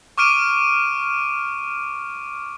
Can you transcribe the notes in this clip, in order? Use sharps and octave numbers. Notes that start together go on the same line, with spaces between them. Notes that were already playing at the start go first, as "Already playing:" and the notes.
C#6 D6 F6 D7 D#7